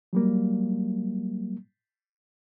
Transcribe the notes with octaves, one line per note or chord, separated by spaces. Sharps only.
F#3 G3 A#3